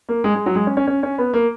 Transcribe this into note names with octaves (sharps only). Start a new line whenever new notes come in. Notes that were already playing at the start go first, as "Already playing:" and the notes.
A#3
G#3
G#3
F#3
G#3
C#4
C#4
C#4
C#4
B3
A#3